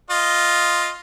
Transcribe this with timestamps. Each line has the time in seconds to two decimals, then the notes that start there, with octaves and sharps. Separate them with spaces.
0.10 F4 D#5